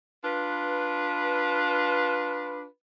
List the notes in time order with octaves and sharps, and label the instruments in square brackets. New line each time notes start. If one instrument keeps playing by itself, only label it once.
[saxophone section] D4 F4 B4